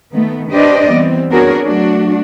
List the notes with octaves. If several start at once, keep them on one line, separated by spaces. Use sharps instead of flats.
D#3 A3 B3
D4 G4 B4 C5 D5 D#5
E3 G3 B3 C4
B3 D4 F#4 G#4 A#4 C#5
F#3 A3 D4 F#4